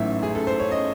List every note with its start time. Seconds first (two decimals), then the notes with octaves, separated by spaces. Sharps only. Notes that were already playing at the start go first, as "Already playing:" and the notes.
Already playing: A1 G#2 F#3 A3 C#4 E5
0.23 G#4
0.35 A4
0.47 C5
0.60 C#5
0.71 D#5